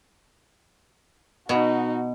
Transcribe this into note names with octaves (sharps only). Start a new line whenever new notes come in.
B2 D#4 F#4